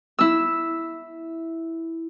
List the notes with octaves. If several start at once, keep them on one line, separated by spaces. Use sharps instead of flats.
E4 E6